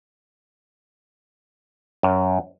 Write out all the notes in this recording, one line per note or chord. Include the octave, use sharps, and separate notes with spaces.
F#2